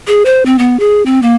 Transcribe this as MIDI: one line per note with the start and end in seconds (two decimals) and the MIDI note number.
0.07 0.23 68
0.25 0.43 72
0.46 0.58 60
0.59 0.79 59
0.80 1.03 68
1.06 1.20 60
1.22 1.35 58